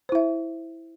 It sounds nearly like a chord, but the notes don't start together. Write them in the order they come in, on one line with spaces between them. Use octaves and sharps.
C5 E4 E5